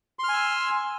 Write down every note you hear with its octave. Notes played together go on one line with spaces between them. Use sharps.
G#5 C6 E6 F6